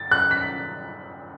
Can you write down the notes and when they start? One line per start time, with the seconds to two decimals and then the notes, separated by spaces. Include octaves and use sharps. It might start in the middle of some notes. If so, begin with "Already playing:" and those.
Already playing: A6
0.11 F#6
0.31 B6